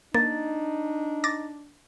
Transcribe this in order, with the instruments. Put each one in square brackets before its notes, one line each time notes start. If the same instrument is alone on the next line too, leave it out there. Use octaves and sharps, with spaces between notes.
[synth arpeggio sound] A#3 [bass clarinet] D4 [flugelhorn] D#4 [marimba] A6
[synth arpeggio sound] D6 A6 A#6